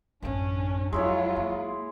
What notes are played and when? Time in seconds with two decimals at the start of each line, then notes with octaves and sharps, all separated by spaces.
0.22 A1 F#2 C#4 D4
0.93 F2 F#3 G#3 E4 F4 C#5
1.36 A#3